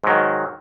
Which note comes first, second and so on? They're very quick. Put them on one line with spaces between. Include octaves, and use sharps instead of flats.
G#2 F#3 D#3